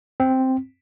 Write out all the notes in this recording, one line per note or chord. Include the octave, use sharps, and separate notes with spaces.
C4